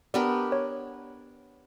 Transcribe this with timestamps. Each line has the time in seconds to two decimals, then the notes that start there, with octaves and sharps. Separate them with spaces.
0.14 B3 D4 G4 A#4 D5
0.52 C#5